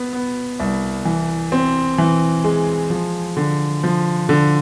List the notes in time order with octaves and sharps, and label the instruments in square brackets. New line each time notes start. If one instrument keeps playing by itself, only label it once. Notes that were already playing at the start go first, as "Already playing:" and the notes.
Already playing: [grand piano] B3
B3
C2
E3
C4
E3
G#3
F3
D3
F3
D3